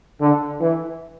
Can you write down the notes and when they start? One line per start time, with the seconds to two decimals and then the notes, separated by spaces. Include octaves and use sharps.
0.21 D3
0.61 E3